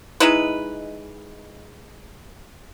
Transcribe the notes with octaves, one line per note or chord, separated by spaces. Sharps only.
G#3 D#4 E4 B4